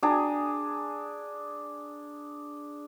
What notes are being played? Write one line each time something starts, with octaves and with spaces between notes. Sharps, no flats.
D4 G#4 A#5